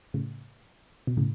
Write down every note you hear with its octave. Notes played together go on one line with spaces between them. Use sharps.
A2 C#3
B2
A2 C#3